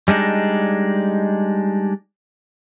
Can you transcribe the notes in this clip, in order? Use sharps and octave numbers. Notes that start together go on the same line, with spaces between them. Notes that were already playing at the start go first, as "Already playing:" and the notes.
G3 G#3 D4 D#4